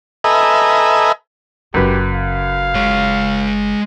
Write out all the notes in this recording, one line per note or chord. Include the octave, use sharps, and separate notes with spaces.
A4 B4 D#5 E5 G#5 A#5
F#1 F#2 C#3 G4 B4
F5
G#3 C#5